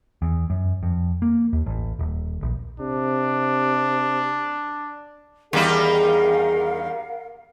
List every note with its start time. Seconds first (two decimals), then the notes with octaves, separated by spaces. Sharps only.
0.22 E2
0.50 F#2
0.83 F2
1.22 A#3
1.53 D#2
1.66 A1
1.99 D#1
2.43 A#1
2.80 C3 D4
5.53 E2 D#3 G3 D#4 G#4 A#4 F5 F#5